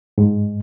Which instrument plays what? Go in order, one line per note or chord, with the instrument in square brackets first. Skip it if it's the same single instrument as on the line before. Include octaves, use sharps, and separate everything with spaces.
[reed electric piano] G#2